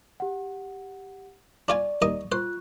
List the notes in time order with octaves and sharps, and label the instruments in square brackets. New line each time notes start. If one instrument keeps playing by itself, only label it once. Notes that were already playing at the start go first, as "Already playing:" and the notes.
[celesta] G4 F#5
[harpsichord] D4 F4 G#5 [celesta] D5 C#6
[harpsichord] D#2 D#5 D#6
[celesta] F4 C#6 F#6 [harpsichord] C5